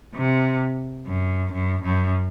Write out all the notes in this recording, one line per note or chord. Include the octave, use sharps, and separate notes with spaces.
C3
F#2
F#2
F#2